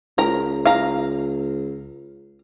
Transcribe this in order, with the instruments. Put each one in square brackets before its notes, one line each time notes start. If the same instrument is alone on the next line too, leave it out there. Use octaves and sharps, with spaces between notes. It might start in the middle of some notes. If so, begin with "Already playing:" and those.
[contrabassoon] C#2 [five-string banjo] A#4 A#5
[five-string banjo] F5 A#5